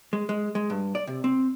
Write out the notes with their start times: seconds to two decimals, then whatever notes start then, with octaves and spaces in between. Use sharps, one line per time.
0.13 G#3
0.29 G#3
0.55 G#3
0.70 G2
0.95 D5
1.07 C3
1.24 C4